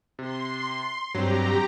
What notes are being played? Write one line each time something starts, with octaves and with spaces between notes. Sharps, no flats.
C3 C6
G2 F#3 C4 G4 A#5